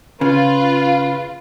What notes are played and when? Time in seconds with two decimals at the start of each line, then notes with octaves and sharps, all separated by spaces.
0.21 C#3 F4 B4